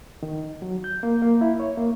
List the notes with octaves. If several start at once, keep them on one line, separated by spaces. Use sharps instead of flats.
D#3
F#3
G6
A#3
A#3
E4
C#5
A#3